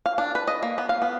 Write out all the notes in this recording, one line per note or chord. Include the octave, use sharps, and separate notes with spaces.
F5
D4
B4
D#5
A#3
B3
F5
B3